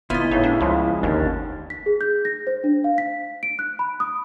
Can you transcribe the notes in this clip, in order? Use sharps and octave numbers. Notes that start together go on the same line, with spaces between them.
G1 B3 E4 F4 D#5
A2 C#3 D#4
D4
C#2 C#3 F3 G#3
G1 D#2 C#4 D4
B6
G#4
G6
A#6
C5
D4
F5
B6
D7
F#6
B5
D#6